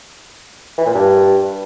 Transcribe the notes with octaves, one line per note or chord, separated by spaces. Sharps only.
E3
A#2
G2